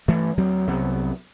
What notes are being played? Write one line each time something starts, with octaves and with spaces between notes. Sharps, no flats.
G2 E3 A3
D2 F#3 C4
C2 C3 F#3 B3